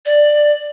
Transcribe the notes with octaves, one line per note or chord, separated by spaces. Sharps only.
D5